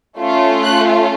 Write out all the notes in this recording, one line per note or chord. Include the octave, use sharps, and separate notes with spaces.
A3 C#4 F4
F#6